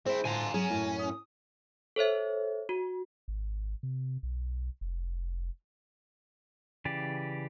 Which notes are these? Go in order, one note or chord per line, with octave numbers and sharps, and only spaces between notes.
C4 E4 G#4 C5
A2 D3 F4 G#5 A#5
F#3 C#4 G#4
F#2 A2 E4
D#6
A4 C5 C#5 E5
F#4
G#1
C3
B1
F1
C#3 E3 G4 D5